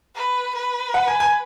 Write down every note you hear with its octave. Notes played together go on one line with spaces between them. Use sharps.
B4
B4
F#5
G#5
G#5